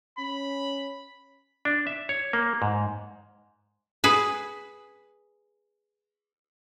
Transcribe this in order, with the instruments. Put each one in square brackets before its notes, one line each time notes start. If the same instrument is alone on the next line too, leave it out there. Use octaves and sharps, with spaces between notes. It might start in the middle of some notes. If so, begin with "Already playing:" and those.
[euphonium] C#4 [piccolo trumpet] B5
[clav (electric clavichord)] D4
E5
C#5
A#3
G#2
[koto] G#4 B4